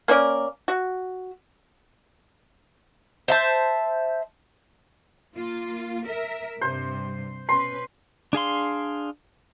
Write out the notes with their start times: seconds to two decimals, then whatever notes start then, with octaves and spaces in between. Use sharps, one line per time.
0.08 A#3 C#4 A#4 D5
0.68 F#4
3.28 C5 E5 A5
5.36 A#3 F4
6.06 A#4 E5
6.61 G2 C3 C5
7.49 B2 C#4 B4 C6
8.33 D4 G#4 F5 C6